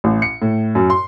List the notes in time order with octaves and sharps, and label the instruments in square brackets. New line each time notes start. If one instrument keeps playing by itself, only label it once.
[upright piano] A1
C#7
A2
F#2
C6